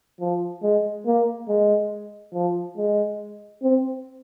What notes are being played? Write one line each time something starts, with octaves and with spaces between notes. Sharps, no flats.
F3
G#3
A#3
G#3
F3
G#3
C4